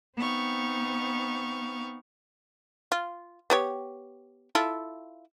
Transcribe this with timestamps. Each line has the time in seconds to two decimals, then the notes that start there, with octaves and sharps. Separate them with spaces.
0.17 B3 C4 D#4 F5 C#6
2.92 F4
3.50 B3 G4 C#5
4.55 E4 F4 A4